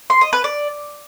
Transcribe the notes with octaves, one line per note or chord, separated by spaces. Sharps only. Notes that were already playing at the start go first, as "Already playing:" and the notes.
C6
D#5
B4
D5